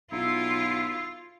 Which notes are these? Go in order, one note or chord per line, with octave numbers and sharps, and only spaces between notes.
B1 E4 F4